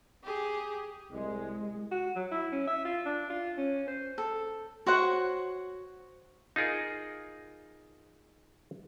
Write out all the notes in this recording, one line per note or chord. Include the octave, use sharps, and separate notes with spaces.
G4 G#4
C2 G#3
F#4
F#3
E4
C#4
E5
F4
D4
F4
C#4
C5
A4
F#4 C5 C#5 F#5
D#4 F4 G#4 A#4